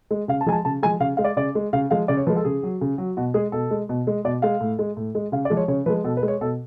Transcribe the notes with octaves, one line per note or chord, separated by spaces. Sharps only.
G#3
C#3 F5
A5
F3 G#3 G#5
A5
C#3 A5
F3 G#3 G#5
C#3 F5
G#3 F5
D5
C#3 D5
G#3
C#3 F5
F3 G#3 F5
C#3 D5
C#5
F3 G#3 B4
A4
C#3 G#4
F#3
C#3
F#3
B2 F#4
G#3 G#4
B2 A4
G#3
B2
G#3
B2 D5
G#3 F5
A2
G#3
A2
G#3
C#3 F5
D5
F3 G#3
C#5
C#3 C#5
F3 G#3 B4
B2 A4
B4
G#3
C#5
B2 A4